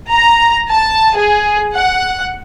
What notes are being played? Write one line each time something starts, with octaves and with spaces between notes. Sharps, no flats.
A#5
A5
G#4
F#5